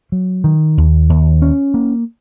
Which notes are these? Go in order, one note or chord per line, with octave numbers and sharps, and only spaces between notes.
F#3
D#3
D#2
D#2
C#4
A#3